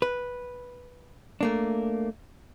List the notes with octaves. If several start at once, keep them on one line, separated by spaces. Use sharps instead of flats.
B4
A3 A#3 D4